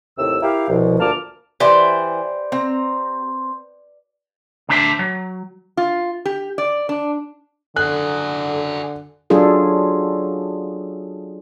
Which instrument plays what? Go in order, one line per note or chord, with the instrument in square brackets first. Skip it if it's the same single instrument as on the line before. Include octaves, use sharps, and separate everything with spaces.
[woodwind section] D#2 A2 C3 E6
E4 G4 A#4 F5
C2 B2 F3
D2 A#2 A#3 A5 D6 F6
[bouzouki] E3 [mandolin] G4 C5 [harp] B4 D5
[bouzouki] C4 A#5
[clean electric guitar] D2 D3 D4 C5 E5
F#3
[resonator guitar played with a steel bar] F4
G4
D5
D4
[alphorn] D3 [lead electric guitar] F#4 G#4 [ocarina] A4 [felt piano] F#6
[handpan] F#3 D4 F4 G#4 A4